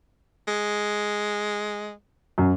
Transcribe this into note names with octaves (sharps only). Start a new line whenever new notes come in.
G#3
F#2